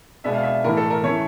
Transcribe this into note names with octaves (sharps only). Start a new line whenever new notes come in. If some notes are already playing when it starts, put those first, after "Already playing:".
B2 G#3 B3 D4 E5
F5
E5
A2 E3 A3 A#4
A4
A#4
E3 A3 C#4 C#5